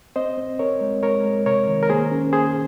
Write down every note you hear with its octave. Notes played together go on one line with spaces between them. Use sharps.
C4 C5 D#5
C4
C4 A#4 C#5
G#3
G#3 A#4 C#5
G#3
C3 A#4 C#5
D#3
A#4
A#3 G#4 C5
C#4
A#3 G#4 C5